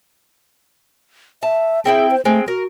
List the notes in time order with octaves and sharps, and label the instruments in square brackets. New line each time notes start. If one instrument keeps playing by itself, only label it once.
[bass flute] E5 [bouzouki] A5
[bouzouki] C4 E4 G5 [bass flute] G#4
[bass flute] C5
[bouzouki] G#3 C4 [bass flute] A3
[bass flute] F#4 [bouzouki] A#4